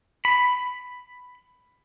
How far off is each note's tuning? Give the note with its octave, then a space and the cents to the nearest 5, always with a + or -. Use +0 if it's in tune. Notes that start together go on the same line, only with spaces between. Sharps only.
B5 +5